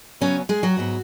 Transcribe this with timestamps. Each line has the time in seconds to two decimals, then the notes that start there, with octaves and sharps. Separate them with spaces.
0.21 C#3 F#3 B3 C#4 C#5
0.49 G#3 G#4
0.63 F#3 F#4
0.77 G#2 F#3 B3